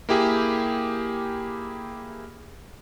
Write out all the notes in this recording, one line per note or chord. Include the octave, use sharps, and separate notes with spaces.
A#3 E4 G4 G#4